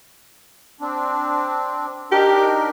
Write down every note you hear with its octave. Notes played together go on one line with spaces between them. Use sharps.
C4 D4
D4 D#4 G4 A#4